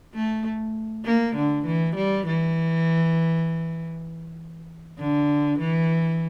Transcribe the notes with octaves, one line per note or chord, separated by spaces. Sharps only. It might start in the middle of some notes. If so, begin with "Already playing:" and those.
A3
A#3
D3
E3
G3
E3
D3
E3